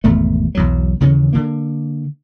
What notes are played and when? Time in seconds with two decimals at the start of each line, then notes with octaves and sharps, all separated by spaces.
0.04 G#1 E2 B2 A3
0.55 B1 E2 F#3
1.00 D#2 C#3 E3 C#4
1.33 D3 A#3